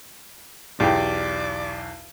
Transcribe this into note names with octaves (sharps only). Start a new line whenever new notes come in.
B1 E2 G4 G#4 D5 G5